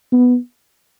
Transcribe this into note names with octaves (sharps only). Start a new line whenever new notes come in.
B3